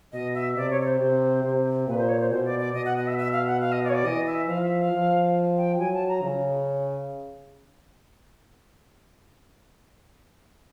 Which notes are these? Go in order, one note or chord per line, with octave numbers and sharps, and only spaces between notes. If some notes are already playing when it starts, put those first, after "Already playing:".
B2 D#5
E5
C3 D5
C#5
C#5
C5
C3
C3
A#2 B4
C5
C#5
C5
B2 C5
D5
D5
B2 D#5
F#5
D#5
E5
E5
F5
F#5
F5
D#5
D5
C#5
D5
E3 D#5
E5
F3 F5
E5
F5
F3
G5
F#3 G#5
A5
A#5
C#3